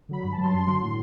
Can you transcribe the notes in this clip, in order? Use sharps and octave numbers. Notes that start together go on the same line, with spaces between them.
D3 F#3 B5
G2 B5
A5
F#3
C6
F#2
D3 F#3
A2